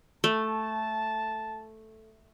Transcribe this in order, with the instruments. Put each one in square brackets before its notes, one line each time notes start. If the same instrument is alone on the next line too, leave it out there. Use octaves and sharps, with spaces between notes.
[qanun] A3 [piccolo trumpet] A5